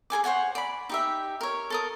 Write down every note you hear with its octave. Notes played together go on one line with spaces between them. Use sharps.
G#4 A4 G#5 D6
C5 C#5 F#5 G#5
D5 B5
D#4 G4 E5
A#4 C#5
A4 A#4 D#6